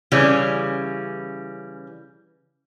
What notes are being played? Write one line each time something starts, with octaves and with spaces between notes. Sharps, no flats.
C#3 E3 G3 C#4